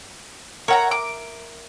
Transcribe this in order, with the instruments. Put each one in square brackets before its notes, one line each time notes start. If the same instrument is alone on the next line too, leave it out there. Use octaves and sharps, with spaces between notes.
[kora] A#4 E5 [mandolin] C#5 F#5 A#5
[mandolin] D6